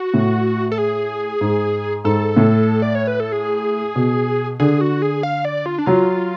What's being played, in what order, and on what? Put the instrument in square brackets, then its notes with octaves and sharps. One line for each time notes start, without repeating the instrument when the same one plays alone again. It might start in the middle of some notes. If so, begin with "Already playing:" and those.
Already playing: [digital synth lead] F#4
[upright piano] A2
[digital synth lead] A4
G#4
[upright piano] G#2
[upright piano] G#2 [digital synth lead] A4
[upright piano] A2
[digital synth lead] D5
C#5
B4
A4
G#4
[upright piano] B2
[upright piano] D3 [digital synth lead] G#4
[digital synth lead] F#4
G#4
F5
D5
F4
D4
[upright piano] F#3 [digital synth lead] F4